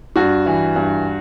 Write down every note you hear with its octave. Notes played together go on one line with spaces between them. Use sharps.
G2 F#4
E3
G2